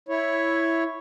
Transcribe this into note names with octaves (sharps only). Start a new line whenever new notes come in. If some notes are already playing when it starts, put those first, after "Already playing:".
E4 C#5